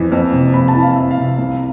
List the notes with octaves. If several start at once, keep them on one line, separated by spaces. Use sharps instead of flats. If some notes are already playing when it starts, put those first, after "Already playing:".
Already playing: F2 E3
F2
C3
F2 B5
A5
E3
F5
F2 E5
F5
C3
C2